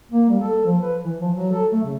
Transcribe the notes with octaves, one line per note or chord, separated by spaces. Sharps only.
A#3
G3
A4
F3
B4
E3
F3
F#3
A4
A3
C#3